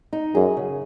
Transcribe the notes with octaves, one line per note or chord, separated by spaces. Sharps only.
D#4
F#2 G#4
C#3